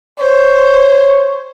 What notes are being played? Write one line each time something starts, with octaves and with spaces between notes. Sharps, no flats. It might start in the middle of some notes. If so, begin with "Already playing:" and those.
C5 C#5